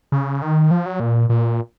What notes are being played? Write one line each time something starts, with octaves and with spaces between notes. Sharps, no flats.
C#3
D#3
F3
F#3
A#2
A#2